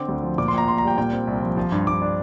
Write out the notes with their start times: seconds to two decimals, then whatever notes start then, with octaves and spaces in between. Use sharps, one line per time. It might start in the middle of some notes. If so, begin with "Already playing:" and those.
Already playing: D3 C4 D6
0.09 D2
0.23 F3
0.38 A#2 D6
0.48 C6
0.53 A#1 A#5
0.68 A#1 C6
0.78 A#5
0.83 G3 G5
0.98 A#2 G5
1.13 C4
1.27 C2
1.42 F3
1.57 F3
1.72 G2
1.87 G2 D6
2.02 D4